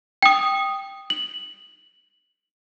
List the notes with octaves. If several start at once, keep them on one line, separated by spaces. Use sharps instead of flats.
G5 D#6
F#7